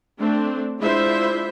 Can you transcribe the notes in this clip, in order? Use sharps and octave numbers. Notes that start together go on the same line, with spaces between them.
A3 C4 D4
G#3 D4 E4 F4 C5 E5